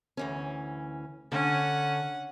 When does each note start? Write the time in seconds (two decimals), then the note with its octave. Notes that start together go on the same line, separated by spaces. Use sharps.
0.17 D2 E3 C#4
1.32 D3 C#4 F#5